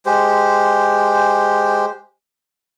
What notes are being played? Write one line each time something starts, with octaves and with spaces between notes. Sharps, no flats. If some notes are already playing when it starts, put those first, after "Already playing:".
G#3 G4 C5